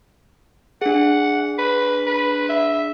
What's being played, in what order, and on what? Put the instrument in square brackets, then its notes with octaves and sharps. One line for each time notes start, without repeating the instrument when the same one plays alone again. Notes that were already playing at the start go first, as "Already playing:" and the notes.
[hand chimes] D4 G#4 [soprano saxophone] F#5
[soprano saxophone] B4
B4
E5